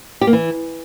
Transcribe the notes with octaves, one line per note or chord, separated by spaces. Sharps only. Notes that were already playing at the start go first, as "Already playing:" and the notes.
G4
A#3
E3